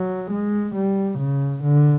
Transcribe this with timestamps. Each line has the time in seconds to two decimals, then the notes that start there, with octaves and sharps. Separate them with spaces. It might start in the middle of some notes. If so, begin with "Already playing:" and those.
Already playing: F#3
0.31 G#3
0.75 G3
1.19 C#3
1.63 D3